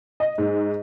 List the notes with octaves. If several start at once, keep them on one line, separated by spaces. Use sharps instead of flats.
D#5
G#2